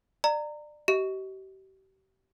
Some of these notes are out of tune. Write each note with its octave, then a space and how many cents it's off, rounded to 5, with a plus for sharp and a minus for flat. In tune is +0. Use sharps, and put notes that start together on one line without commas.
D5 +25 A#5 -20
G4 -40 D#5 +30